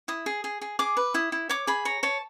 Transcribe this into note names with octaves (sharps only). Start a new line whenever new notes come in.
E4 D#6
G#4
G#4
G#4
G#4 D6
B4
E4 D#6
E4
C#5 D6
G#4 B5
C#5 A#5
C#5 A5